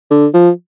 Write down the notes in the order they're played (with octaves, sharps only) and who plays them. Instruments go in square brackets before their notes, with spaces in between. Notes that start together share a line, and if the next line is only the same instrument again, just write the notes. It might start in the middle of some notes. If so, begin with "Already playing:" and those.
[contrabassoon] D3
F3